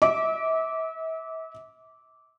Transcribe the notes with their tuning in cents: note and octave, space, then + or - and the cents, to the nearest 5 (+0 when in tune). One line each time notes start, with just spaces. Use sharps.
E5 -40 D6 -15